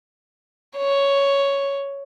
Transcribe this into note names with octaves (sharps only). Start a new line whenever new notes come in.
C#5